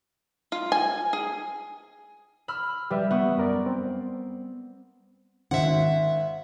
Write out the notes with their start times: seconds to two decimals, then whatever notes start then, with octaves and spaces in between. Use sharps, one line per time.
0.52 F4
0.72 G#5
1.13 G#4
2.48 B5 E6 F6
2.91 G3 G4 B4 E5
3.11 B3 E5 C#6
3.37 F#2 A#4 D5
3.66 C4
5.51 G#1 E5 F#5